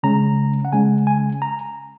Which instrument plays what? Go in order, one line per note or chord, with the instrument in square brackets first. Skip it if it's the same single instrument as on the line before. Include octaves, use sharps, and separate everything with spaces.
[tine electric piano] C#3 G#3 C#4 A#5
F#5
C#3 G#3 C#4 G#5
G#5
A#5